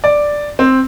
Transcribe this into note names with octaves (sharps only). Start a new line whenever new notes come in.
D5
C4